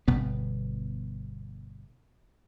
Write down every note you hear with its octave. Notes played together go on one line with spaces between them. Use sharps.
G1 B2 B3